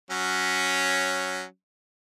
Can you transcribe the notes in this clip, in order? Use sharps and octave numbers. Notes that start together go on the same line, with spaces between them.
F#3 C#4